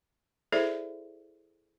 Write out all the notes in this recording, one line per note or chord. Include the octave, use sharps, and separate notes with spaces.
E4 G#4 A4 C5 D5 E5